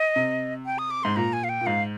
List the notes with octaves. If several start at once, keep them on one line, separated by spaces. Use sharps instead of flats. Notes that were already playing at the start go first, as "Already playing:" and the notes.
Already playing: D#5
C3
G5
D#6
D6
G#2 C6
A#2 A#5
G#5
F5
G5
A#2
G#2 F5